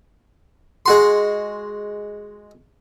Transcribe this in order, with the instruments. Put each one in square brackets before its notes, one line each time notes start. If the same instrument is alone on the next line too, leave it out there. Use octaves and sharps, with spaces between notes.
[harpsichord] G#3 F#4 C6